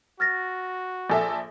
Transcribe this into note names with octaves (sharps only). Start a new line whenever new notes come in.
F#4 F6 A6 A#6
A#1 A4 E5 G#5